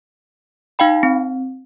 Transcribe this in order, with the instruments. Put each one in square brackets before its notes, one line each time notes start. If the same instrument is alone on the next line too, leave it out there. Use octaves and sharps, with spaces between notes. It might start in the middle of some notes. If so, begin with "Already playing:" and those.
[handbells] D#4 F5 G5 B5
C4